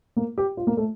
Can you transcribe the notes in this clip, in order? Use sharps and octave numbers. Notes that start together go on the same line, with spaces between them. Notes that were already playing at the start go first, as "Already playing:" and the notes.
A#3
G4
F4
A#3
A3